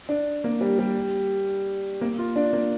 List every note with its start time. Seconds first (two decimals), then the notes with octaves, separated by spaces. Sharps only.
0.09 D4
0.44 A#3
0.61 G3
0.79 G3
2.01 A#3
2.18 F4
2.36 D4
2.53 A#3